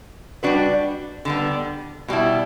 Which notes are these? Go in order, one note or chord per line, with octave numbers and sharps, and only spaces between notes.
G3 D4 F#4 B4
D3 G3 B3
B2 G3 B3 E4